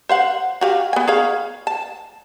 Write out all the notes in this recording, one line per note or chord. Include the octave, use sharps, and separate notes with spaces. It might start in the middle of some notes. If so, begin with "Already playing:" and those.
C5 F5 F#5
F#4 G4 F5
B3 G#5
G#4 C#5 F5
A5